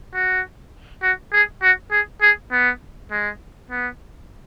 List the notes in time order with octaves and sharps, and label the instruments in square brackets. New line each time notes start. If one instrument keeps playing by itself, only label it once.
[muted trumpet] F#4
F#4
G#4
F#4
G#4
G#4
B3
G#3
B3